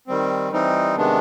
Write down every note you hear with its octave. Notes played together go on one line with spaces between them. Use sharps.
D#3 G3 C4
E3 G3 C4 D#4
C3 D#3 G#3 B3 D4